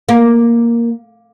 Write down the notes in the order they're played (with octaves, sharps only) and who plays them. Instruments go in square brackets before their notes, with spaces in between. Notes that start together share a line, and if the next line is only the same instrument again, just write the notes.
[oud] A#3